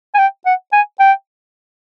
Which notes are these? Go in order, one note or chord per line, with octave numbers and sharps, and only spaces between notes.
G#5
G5
F#5
G#5
G5